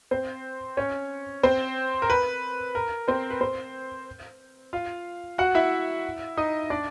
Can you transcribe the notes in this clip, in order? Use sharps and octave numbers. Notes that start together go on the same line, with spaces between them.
C4 C5
C#4 C#5
C4 C5
A#4
B4
A#4
C4 C5
B4
C4 C5
F4 F5
F#4 F#5
E4 E5
D#4 D#5
D4 D5